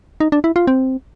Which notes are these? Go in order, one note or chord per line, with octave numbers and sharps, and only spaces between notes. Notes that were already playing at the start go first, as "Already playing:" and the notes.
D#4
D4
E4
F4
C4